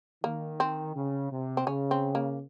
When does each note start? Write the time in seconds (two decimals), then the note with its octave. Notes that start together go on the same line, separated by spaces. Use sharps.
0.23 D#3 A#3
0.60 C4
0.95 C#3
1.31 C3
1.57 C4
1.67 C#3 C#4
1.91 C4
2.15 A#3